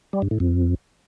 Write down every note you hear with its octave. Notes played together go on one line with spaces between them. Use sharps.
G3
G2
A2
F2